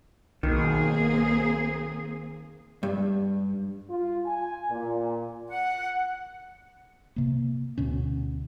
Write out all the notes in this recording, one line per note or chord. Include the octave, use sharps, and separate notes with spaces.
B1 D#3 A#3 C4 G#4
G2
F4
G#5
A#2
F#5
C3 A#3
D2 B2 C#4